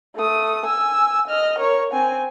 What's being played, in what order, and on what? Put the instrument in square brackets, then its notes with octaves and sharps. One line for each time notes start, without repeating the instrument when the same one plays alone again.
[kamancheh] A3 D#6
G#5 E6
D#5 F6
A#4 C#5
C4 G#5